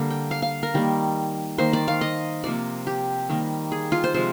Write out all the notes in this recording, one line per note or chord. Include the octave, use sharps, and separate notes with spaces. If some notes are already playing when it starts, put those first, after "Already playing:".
Already playing: D3 G3 A#3
G5
F5
F5
A#4
D#3 G3 A#3
D#3 A#3 C5
D5
F5
D#5
C3 F3 A#3 D5
G4
D#3 G3 A#3
G#4
F4
C5
C3 F3 G#3 C5